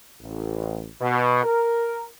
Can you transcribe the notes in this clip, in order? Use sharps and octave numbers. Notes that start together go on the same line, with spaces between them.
A1
B2
A#4